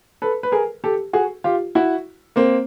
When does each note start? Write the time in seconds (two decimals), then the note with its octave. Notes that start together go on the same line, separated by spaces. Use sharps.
0.22 A4 B4
0.43 B4
0.52 G#4 A#4
0.84 G4 A4
1.13 F#4 G#4
1.44 F4 G4
1.75 E4 F#4
2.36 A#3 C4